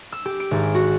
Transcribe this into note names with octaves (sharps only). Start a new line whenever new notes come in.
E6
G4
D7
G#1
F#4